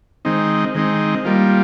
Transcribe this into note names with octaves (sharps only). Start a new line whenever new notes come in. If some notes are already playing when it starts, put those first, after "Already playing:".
D#3 G#3 C4 D#4
D#3 G#3 C4 D#4
G3 A#3 F4